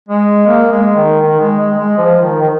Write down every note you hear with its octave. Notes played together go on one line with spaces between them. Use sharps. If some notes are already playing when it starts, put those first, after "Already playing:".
G#3
A#3
G#3
D#3
D#3
G#3
G#3
G#3
F3
D#3
D#3